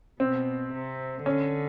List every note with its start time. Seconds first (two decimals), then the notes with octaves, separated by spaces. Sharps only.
0.20 B2 C4
0.73 C3
1.26 D3 C#4